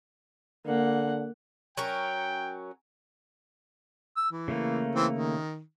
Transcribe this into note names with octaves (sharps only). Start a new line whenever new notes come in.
D3 A#3 F#5
F#3 C#4 A#4 G5
E6
E3
C#3 A3 A#3
E3 C4
D#3